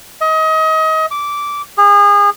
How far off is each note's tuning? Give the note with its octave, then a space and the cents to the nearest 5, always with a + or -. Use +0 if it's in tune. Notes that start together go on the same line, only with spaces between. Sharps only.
D#5 +30
D6 -15
G#4 -35